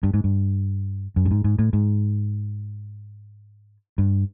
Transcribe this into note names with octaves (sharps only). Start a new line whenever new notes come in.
G2
G#2
G2
F#2
G2
G#2
G#2
A2
G#2
G2